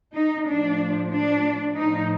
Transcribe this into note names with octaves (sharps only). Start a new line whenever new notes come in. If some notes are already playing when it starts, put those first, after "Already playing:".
D#4
A2 F3 D4
D4
A2 F3 D#4